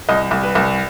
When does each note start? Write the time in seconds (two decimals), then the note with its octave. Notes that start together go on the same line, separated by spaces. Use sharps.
0.09 C2 D#5
0.31 C2
0.43 B4
0.55 C2